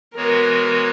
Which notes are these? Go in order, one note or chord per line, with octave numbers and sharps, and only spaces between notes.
E3 G#3 B3 F#4 A#4 C#5